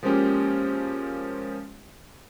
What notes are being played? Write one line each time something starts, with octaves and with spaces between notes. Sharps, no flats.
F3 G#3 A#3 C#4 G4